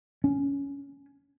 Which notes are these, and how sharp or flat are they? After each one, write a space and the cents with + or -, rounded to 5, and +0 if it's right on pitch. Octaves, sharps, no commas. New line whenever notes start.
C#4 +15